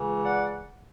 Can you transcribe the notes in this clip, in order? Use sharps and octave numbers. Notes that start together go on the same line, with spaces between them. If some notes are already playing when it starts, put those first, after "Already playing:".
Already playing: C#2 C#3 E3
D5 F#5